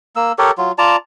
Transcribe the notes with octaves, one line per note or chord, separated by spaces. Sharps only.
A#3 E6
G4 A4 A#4 C#5
F#3 F4
F4 D5 A5 A#5